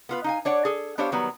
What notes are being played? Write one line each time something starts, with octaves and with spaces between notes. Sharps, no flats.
B3 F4 B4
D#4 F5 G#5
D4 C#5 D5 F#5
G#4 A4
B3 D4 G4 C5 C#5 F5
D#3 F#3 G3 B3